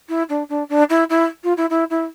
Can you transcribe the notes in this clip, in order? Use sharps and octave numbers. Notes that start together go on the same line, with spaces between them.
E4
D4
D4
D4
E4
E4
F4
E4
E4
E4